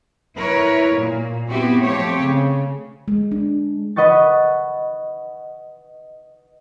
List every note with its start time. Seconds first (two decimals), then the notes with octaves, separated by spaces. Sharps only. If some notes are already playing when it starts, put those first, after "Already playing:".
0.36 E4 A#4 B4 C#5
0.95 A#2 A#3
1.48 B3 C4 E4 F#4 G4
1.82 F3 A3 C4 G4 C#5
2.22 C#3
3.08 G#3
3.32 D4
3.96 B4 D#5 F#5 C#6 A6